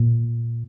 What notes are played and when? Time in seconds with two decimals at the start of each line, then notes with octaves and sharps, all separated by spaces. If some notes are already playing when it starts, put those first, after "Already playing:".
Already playing: A#2